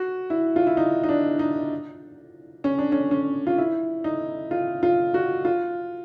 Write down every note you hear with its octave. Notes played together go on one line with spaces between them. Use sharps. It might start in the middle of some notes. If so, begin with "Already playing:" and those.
Already playing: F#4
E4
F4
E4
D#4
D#4
D4
D#4
C#4
D4
C#4
C#4
F4
E4
D#4
F4
F4
F#4
F4